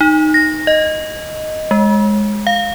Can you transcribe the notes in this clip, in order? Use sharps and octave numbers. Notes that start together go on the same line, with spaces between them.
D#4
A#6
D#5
G#3
F5